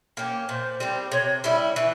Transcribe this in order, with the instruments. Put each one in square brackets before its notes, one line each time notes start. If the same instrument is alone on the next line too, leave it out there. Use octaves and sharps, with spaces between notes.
[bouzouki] A#3 C#4 G4
[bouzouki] A#2 [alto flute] C5
[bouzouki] G3 C4 G4
[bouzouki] C3 [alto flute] C#5
[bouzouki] G3 C#4 E4 [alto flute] E5
[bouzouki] E3 [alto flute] E5